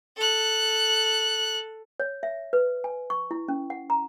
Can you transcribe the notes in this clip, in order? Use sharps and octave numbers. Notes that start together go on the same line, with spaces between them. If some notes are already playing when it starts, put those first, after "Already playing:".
A4 F#6
C#5
E5
B4
G#5
C#6
E4
C#4
F#5
A#5